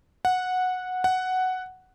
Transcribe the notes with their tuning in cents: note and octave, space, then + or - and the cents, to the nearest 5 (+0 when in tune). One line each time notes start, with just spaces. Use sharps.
F#5 -10
F#5 +5